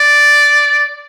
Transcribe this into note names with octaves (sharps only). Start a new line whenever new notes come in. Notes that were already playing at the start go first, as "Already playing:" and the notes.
Already playing: D5